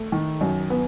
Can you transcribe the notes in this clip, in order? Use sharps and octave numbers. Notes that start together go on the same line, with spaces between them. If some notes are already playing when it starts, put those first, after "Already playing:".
Already playing: A3
D#3
F#2
B3